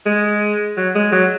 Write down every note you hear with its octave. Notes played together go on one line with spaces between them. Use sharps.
G#3
F#3
G#3
F#3